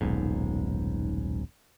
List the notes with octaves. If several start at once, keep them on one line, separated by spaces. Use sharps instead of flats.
D#1 B1 G#2